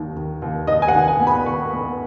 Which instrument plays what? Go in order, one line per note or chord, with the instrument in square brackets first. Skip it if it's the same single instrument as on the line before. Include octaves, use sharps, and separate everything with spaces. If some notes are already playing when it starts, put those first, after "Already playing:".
Already playing: [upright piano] D#2 D#3
D#3
D#2
D#2 D#5
G#5
F#5
D#3
G#5
B3
B5
D#3 C#6
B3